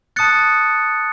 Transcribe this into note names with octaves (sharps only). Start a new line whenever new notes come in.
A5 D#6 F#6 A6 C#7